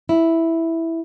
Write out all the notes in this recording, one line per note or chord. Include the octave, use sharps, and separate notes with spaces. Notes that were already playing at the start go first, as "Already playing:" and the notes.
E4